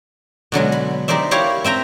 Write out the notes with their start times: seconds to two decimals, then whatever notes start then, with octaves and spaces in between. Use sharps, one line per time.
0.52 B2 D3 F#3 G#3
0.72 B5
1.08 D#4 G4 A#4 C5 D5 E5
1.31 E4 G4 C#5 F5
1.64 C4 E5 G5 A#5